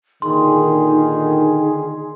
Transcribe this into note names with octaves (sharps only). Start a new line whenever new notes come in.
A#2 D3 D#3 D#4 G#4 C6